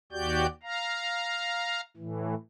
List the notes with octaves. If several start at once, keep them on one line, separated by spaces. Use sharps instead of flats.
D#2 F#4 G4 D5 G6
F5 A#5
A2 E3